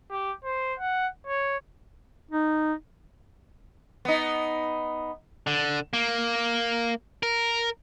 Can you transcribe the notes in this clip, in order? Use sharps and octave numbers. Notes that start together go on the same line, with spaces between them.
G4
C5
F#5
C#5
D#4
B3 D#4
D3
A#3
A#4